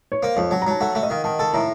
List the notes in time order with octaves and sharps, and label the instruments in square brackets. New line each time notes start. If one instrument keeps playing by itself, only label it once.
[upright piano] C#5
[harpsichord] A#3 [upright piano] C5
[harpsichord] F2 [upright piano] C#5
[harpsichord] F#3 [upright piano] A5
[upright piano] A#5
[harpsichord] F#3 [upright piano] A5
[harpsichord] A3 [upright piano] F#5
[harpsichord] A3
[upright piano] D#5
[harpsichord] D#3 [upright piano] F5
[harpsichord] D#3 [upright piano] A5
[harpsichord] A4 [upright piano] A5
[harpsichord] A2 [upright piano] A#5